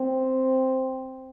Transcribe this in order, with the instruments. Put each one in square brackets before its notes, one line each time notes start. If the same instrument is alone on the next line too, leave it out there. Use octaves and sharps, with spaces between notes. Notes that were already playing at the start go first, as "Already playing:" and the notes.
Already playing: [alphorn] C4